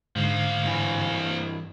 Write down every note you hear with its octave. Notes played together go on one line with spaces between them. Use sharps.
G#2 D3 F3 A#3
G2 E3 G#5